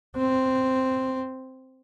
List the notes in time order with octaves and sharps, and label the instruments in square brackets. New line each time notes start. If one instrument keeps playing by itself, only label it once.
[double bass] C4